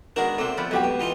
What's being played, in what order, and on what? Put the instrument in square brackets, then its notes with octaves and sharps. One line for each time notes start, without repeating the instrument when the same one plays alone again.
[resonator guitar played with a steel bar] D#3 G#3 B3 [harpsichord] D4 F#4 A#4
[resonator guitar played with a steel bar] C3 D5 [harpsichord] A3 C4
[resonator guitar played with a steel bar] F3 B3 D5
[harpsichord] B1 F2 F#4 [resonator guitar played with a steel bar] G#3 G4 G5
[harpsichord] B2
E3 D#4 F4